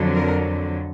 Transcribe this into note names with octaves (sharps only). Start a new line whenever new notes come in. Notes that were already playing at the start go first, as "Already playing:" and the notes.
Already playing: F2 D3 F#3
A#4